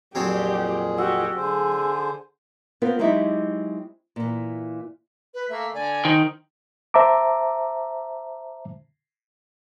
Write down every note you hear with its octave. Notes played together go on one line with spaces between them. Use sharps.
F2 A#2 F#3 C4 D4 G4 G#4
F#4 G4 E6
D3 G#4 C5
B3 C4 F4 A#4 B4
F#3 G#3 C4 D#4 E4 G4
A#2 E3
B4
A3 A#3 E5
D3 D5 G#5
D#3 C5
C5 E5 A5 A#5 D6